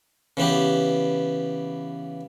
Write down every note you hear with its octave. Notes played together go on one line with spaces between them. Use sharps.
C#3 E3 B3 G4